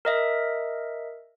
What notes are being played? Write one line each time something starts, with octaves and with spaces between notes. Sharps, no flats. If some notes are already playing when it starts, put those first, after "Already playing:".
A#4 D#5 E5